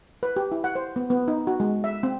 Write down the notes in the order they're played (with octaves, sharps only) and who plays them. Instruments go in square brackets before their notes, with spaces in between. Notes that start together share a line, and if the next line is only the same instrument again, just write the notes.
[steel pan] B4
G4
E4
F#5
C5
B3
B3
D#4
F#4
G#3
E5
C4